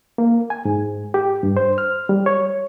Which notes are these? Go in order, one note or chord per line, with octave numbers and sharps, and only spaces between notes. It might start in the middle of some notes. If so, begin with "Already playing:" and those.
A#3
G#5
G#2
G4
G2
C5
F6
G3
C#5